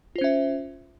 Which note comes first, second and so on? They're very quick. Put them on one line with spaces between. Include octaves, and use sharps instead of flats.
F4 C5 C#4 E5